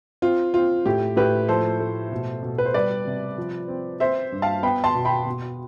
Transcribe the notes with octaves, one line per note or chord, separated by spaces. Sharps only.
C4 F4
C4 F4
A2 G4
A2 G4 B4
F3 A4 C5
A3
B2
B2
B4
C5
G3 B4 D5
C3
F3
C4
C4 C5 E5
G2
F5 A5
B3 G5 B5
A5 C6
B2
G5 B5
B2